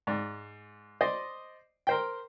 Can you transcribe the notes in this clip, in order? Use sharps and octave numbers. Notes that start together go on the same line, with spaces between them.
G#2 D5
C5 D5 D#5
A#4 C5 G5